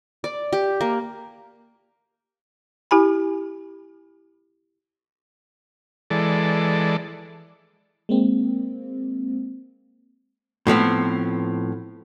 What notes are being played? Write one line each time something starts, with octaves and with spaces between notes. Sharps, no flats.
D5
G4
A#3
E4 G4 G#5 B5
E3 G#3 A4 D5
G#3 A#3 C4
A2 F3 B3 C4